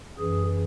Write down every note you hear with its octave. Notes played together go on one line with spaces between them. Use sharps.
F#2 E3 G#4